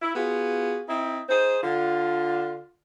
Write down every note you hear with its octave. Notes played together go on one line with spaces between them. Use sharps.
E4
B3 F4 F#4 G#4
C4 D#4 E4
D#4 G#4 C5
D3 F4